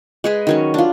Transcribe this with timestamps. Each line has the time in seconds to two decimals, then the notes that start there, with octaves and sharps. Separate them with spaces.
0.24 G#3 G#4 B4
0.47 D#3 F#3 C#4
0.74 D4 F4